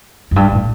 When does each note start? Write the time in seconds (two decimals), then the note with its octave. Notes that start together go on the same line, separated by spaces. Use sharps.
0.31 F#2
0.36 G2
0.52 A2